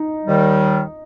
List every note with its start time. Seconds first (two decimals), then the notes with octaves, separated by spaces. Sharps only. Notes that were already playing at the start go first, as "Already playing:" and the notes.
Already playing: D#4
0.26 D#2 D#3 G3